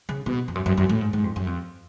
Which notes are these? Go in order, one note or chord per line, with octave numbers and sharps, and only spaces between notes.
C#3
B2
F2
F#2
F#2
F#2
A2
G#2
G#2
F2
F#2
F2